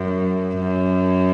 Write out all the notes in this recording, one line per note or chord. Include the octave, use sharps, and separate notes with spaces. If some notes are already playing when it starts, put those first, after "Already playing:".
Already playing: F#2
F#2